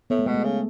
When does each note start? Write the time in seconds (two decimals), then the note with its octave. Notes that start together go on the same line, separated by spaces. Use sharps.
0.10 A2 B3
0.19 A3
0.26 B2 G#3
0.34 A3
0.44 C#3